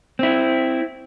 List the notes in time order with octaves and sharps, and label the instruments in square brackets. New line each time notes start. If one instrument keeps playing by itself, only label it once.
[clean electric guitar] C4 E4